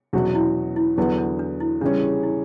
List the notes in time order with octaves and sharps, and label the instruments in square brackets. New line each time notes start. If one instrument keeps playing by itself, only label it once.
[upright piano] E2 B2 F#3 C#4 F#4 [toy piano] D4
[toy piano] E4
E4
[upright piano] E2 D3 F#3 B3 [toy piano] E4
[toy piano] D4
D4
E4
[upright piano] C#3 E3 G3 C#4 [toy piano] D4
[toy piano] E4